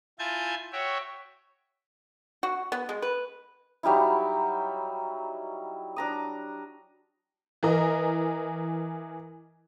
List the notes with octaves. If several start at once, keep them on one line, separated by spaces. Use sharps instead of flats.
E4 F4 G#5 A5 G6 G#6
F#4 C#5 E5 G5
F#4
B3
G#3
B4
F#3 G3 D#4 E4
D4 A#5 D#6
E3 A#4 D#5